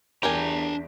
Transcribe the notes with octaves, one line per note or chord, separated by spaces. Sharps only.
E2 D4 G4 A#4 G#5 A#5